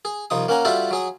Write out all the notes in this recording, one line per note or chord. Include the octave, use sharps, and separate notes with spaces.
G#4
C2 F3 D#4 D#6
A#3 C#4 F#5 G#5 A#5
G3 F4 F#4 A4 C5 E5
F#3 G#4 D#6